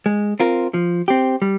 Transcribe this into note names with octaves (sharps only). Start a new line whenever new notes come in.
G#3
C4 F4 A#4
F3
C4 G4
G3